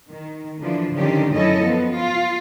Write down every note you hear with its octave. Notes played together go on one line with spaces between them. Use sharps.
D#3
D3 E3 F3 D4
D3 D#3 F3 C#4 G4
F#2 C#4 E4 A4 D#5
F3 B3
F4